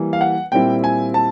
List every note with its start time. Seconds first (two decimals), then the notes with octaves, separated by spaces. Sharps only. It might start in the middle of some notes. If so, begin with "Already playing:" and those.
Already playing: E3 G3 A#3
0.13 F5
0.21 F#5
0.52 A#2 G3 C4 E4 G5
0.84 G#5
1.14 A5